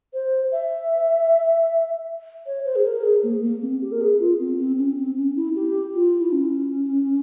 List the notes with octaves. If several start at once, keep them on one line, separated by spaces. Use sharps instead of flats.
C5
E5
C#5
C5
G#4
A#4
A#4
G#4
A#3
A#3
C4
G4
A#4
G#4
F4
C4
C4
C#4
C4
C#4
E4
G4
F4
E4
C#4